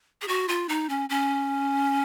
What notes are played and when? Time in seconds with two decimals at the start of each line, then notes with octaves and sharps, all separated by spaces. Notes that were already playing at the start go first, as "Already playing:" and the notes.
0.22 G#4
0.28 F#4
0.48 F4
0.69 D#4
0.89 C#4
1.09 C#4